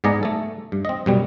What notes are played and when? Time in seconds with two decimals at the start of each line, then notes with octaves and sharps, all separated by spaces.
0.04 G#2 B3 D5 D#5 G#5 A#5
0.23 A3 A4
0.72 G2
0.85 C4 D#5
1.06 F#2 B2 G3